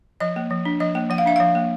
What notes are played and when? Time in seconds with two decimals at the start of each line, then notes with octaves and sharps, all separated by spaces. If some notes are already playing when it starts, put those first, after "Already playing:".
0.20 F3 D#5
0.36 A#3
0.51 F3
0.65 D4
0.80 F3 D#5
0.95 A#3
1.10 F3 F#5
1.18 F5
1.26 D4 E5
1.36 F3 F5
1.55 A#3